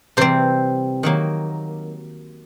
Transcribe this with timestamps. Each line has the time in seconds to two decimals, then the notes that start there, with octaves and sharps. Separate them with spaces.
0.17 C3 E3 G3 C4 C5
1.03 D#3 F#3 A#3